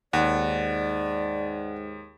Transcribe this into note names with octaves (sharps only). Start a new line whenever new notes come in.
D#2 G#2 D5 F#5